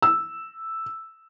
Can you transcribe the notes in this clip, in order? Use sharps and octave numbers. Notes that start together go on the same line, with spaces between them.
E6